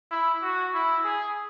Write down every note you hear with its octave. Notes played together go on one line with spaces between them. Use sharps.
E4
F#4
E4
G#4